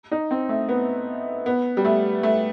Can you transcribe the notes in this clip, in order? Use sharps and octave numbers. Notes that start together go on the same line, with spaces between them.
D#4
C4
A3
B3
B3
G3
A3
A3